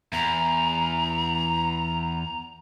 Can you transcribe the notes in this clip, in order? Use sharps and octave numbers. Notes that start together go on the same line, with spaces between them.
E2 A#5